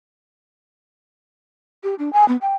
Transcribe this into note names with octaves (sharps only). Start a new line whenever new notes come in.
G4
D4
G#5
B3
G5